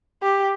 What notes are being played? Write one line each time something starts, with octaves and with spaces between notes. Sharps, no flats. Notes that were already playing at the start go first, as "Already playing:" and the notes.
G4